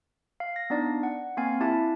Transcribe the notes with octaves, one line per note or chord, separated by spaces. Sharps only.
F5
A#6
B3 D4 D#4 D5
F#5
A#3 C4 F5 G#5 G#6
E4 G4 E5 A5